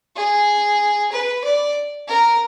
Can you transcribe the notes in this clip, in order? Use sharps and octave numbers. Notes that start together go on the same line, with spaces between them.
G#4
B4
D5
A#4